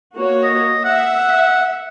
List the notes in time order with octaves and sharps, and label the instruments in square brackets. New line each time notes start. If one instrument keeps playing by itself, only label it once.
[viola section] A#3 F#4 C#5
[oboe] D#5
[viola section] E5 [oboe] F#5